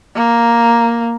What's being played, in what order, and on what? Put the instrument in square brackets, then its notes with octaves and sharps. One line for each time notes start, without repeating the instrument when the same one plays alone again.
[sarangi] A#3